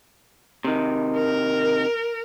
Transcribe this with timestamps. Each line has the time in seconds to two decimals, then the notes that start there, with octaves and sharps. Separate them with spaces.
0.65 C3 D#3
1.16 A#4